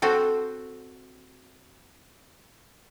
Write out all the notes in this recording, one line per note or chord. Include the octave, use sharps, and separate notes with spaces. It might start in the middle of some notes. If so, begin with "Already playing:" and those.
C4 F#4 A4